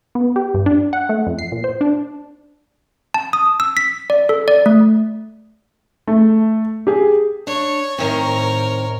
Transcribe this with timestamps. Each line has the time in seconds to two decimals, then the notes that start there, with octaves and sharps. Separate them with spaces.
0.15 B3
0.36 G4
0.54 G2
0.66 D4
0.93 F#5
1.09 A3
1.27 F2
1.39 C7
1.52 A#2
1.64 C5
1.81 D4
3.14 A5
3.33 D#6
3.60 E6
3.77 B6
4.10 D5
4.29 A4
4.48 D5
4.66 A3
6.07 A3
6.87 G4 G#4
7.47 D4 C#5
7.98 A2 D#3 C4 A#4 C#5